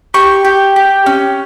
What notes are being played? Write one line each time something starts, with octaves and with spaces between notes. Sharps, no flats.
G4 C#6
G4
G4
C#4